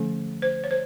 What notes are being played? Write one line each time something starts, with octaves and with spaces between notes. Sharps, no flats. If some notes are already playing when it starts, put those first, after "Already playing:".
Already playing: D3 F3 A3 C#4
C5
C#5
C5